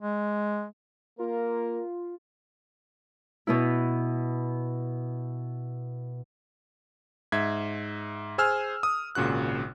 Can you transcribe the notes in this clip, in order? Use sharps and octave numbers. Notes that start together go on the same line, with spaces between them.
G#3
A#3 F4 A#4
B2 B3 E4
G#2 E5 G#6 B6
G#4 C5 G#5 E6 F6
D#6
G#1 A#2 C#3 F#4 F#6